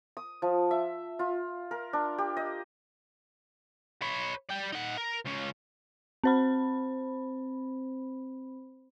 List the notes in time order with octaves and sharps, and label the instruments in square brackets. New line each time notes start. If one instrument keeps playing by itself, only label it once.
[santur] D#6
F3
E5
F4
A#4
D4
G4
D#5
[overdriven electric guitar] B4 C#5
G3 G5
D#4 F#5
A#4
C#2 C#4
[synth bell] C4 C5 B5